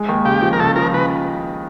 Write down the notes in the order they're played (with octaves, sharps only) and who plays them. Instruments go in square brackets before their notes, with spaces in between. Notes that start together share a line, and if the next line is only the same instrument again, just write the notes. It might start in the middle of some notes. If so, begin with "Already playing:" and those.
Already playing: [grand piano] G#3
D#2
[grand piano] C#3 [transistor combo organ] G4
[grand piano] F3
[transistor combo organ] A#4
[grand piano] C#3 [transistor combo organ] A4
[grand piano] F3 [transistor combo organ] A#4
[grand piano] C#3 [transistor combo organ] B4